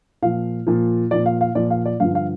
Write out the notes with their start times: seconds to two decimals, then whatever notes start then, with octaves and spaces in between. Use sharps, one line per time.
0.22 A#2 F3 F5
0.67 A#2 F3
1.11 A#2 F3 D5
1.26 F5
1.41 F5
1.55 A#2 F3 D5
1.70 F5
1.86 D5
2.00 G2 D3 F3 F5
2.15 F5